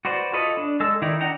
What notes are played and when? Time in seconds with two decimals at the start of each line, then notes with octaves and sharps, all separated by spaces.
0.05 F#4 B4 C5 D5
0.33 F4 A4 C#5 D#5 B5
0.57 D4
0.80 G#3 A4 E6
1.02 D#3 D#4 E4 D5
1.21 D4 D#4 F#5 G5 A#5